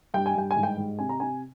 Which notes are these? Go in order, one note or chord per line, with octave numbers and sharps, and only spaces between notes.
G2 G5
G#5
G2 G5
G#5
G#2
G5
G#2
C3 G#5
A#5
C3 G#5